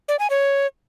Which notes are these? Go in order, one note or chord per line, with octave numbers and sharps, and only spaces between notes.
D5
G#5
C#5